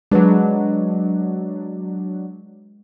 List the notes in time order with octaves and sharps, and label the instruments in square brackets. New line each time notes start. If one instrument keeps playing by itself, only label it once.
[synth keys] F#3 D4 [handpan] G#3 B4